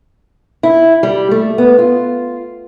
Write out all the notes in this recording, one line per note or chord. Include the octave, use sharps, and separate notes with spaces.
E4
G3
A3
B3
F4